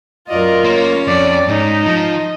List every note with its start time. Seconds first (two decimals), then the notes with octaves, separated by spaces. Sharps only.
0.29 F#2 F4 A#4 D5 D#5
0.64 A#3 C#4 C#5
1.07 F2 D5
1.48 G#2 D#4
1.86 F3 D#5